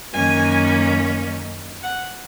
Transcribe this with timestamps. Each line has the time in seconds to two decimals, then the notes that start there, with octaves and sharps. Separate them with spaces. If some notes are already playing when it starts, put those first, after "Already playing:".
0.12 F#2 D#3 A#3 C#4 G#5
1.82 F#5